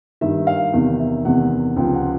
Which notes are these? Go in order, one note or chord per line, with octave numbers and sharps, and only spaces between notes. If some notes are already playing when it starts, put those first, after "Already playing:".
G2 D#3 E5
F5
E2 C3 D#3
E5
E2 C3 D#3 F#5
C#2 C3 F3 G5
F#5